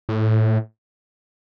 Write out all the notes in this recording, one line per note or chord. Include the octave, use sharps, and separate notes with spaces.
A2